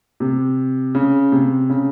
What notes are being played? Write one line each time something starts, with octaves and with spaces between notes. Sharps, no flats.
C3
C#3
C3
C#3